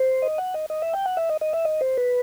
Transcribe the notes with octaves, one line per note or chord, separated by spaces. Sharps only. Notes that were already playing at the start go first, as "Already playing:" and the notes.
Already playing: C5
D#5
F#5
D#5
D#5
E5
G5
F#5
E5
D#5
D#5
E5
D#5
C5
B4